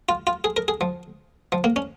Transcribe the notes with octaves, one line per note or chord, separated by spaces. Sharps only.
F4
F4
G#4
A#4
G#4
F3
F3
A#3
C#4